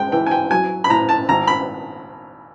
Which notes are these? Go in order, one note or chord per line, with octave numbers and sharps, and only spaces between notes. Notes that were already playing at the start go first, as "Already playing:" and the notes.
Already playing: G#3 G5
E3 G5
G#5
G5
F#3 G#5
B5
A2 A#5
A5
G#1 A#5
B5